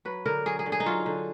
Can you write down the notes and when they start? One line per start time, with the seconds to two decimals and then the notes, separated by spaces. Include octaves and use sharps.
0.05 F#3 B4
0.26 D3 A#4
0.46 F#3 G#4
0.59 G#4
0.66 D3
0.72 G#4
0.80 D#4
0.86 F#3 F4
1.06 D3